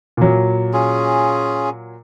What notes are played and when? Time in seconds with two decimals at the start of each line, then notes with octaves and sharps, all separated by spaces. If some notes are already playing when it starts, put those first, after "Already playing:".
0.17 A#2 F#3
0.73 C#4 F4 G#4